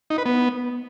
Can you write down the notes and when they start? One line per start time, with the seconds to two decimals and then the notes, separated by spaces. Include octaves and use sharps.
0.10 D#4
0.18 B4
0.26 B3